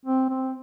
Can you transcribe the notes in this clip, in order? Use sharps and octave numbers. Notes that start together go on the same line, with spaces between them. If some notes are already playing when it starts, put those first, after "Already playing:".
C4
C4